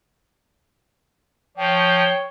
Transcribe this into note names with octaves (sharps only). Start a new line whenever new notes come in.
F3 C#5 G5